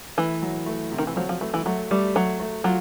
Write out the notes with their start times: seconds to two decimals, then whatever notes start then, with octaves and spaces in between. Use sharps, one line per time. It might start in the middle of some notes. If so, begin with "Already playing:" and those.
0.17 E3 A3
0.42 F#3
0.66 A3
0.92 C3
0.98 D#3
1.07 E3
1.16 F3 F#3
1.29 F3
1.41 E3 A3
1.54 E3
1.66 F#3 A3
1.91 G3 A3
2.15 F#3 A3
2.40 A3
2.64 F#3 F4